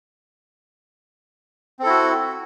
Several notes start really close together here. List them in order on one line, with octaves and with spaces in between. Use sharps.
C4 A4 E4 F#4